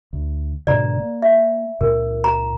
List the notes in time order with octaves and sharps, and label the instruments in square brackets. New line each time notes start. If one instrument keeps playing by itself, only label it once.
[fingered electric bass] D2
[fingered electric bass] G#2 B2 D3 [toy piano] D5 A#5
[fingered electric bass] A#3
[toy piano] E5
[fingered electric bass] C#2 A#2 [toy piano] A#4
[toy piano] A#5